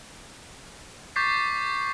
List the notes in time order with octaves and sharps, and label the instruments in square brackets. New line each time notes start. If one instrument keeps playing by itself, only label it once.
[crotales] C#6 D6 G6 A6 B6 C7